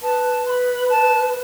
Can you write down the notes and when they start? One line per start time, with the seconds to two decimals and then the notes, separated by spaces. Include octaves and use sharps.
0.02 B4 A5
0.46 C6
0.50 B5
0.89 A5